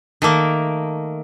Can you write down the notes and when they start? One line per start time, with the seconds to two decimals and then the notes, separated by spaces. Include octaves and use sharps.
0.22 D#3 A3 A#3